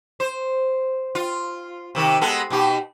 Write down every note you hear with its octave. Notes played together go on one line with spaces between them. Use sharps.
C5
F4
C3 D#3 A#3
G#3 B3 A4
B2 D#4 G4